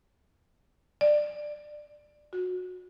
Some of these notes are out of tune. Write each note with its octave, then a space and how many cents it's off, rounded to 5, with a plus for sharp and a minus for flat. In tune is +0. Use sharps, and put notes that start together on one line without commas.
D5 +20
F#4 -20